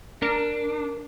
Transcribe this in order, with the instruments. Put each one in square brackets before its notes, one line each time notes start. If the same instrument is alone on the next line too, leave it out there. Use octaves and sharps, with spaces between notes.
[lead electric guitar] D4 [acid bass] A#4